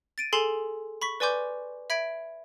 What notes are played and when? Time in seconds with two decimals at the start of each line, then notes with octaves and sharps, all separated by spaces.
0.18 A6 D7 D#7
0.33 G#4 A4 G#5 C6 C7 E7
1.02 B5 C#6 B6
1.20 B4 D5 G#5 C6 D6 G6
1.90 E5 B5 G#6 B6 D7